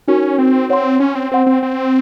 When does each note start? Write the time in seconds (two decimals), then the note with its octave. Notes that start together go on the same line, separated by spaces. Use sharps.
0.08 C#4 D#4 F#4 A#4
0.38 C4
0.69 C4 C#5 F#5 C6
1.00 C#4
1.15 C4
1.32 C4 C5 F#5 C6
1.47 C4
1.63 C4